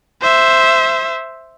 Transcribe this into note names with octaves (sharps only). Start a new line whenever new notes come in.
C5 E5